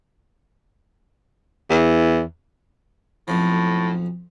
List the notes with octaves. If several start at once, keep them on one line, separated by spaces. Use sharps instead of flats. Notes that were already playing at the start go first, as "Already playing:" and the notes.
E2
B1 F2 A2 F3